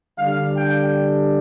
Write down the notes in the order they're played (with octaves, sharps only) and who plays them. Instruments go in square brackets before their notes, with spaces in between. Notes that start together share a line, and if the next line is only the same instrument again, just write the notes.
[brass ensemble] D3 G3 D4 F5
G5